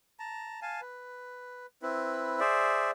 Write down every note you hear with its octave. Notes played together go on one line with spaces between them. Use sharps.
A5 A#5
F5 G#5 A5
B4
C4 E4 B4
G#4 C5 D5 E5